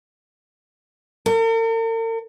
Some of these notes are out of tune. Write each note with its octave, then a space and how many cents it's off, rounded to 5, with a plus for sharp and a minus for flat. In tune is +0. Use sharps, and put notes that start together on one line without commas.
A#4 -45